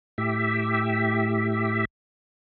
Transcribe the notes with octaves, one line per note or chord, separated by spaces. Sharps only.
A2 G4 E5